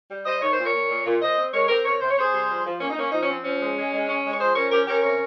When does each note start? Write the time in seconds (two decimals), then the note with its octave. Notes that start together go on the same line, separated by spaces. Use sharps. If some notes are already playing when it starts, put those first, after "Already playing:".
0.10 G3
0.26 G3 C5 D#5
0.41 D#3 C#5
0.53 A#2 C5
0.66 A#4 C#5
0.74 A#2
0.90 A#2
1.06 A#2
1.21 A#2 C5 D#5
1.37 C4
1.53 G#3 A#4 C#5
1.69 C4 G4 A#4
1.85 C3 A#4 C#5
2.00 C3 C5
2.10 C#5
2.17 C3 G#4 C5
2.33 G3
2.49 F3
2.65 F3
2.81 A#3 C#4
2.90 D#4
2.97 A#3 C#4
3.12 F3 D#4
3.23 C#4
3.29 C4
3.44 F3 C#4
3.61 G#3
3.76 G#3
3.92 G#3
4.09 C#4
4.24 G#3
4.33 C#5
4.39 F3 G#4 C5
4.56 C#4 A#4 C#5
4.71 C#4 G4 A#4
4.87 C#4 G4 A#4
5.03 C3 A#4 C#5